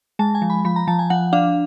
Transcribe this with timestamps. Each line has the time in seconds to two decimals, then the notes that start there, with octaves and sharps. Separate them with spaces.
0.19 G#3 A5
0.35 G#5
0.42 F3
0.50 B5
0.65 F3 B5
0.76 A#5
0.87 F3 A5
0.99 G#5
1.10 F3 F#5
1.33 D4 F5